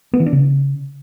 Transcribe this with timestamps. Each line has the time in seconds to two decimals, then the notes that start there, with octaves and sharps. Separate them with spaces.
0.13 B3
0.20 E3
0.26 D4
0.33 C#3